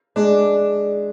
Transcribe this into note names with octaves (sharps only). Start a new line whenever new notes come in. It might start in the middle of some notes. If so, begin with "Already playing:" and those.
G#3 D4